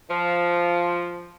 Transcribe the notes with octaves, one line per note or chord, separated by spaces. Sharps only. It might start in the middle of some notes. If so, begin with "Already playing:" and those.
F3